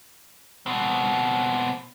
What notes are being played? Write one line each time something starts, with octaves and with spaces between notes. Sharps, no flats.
B2 C4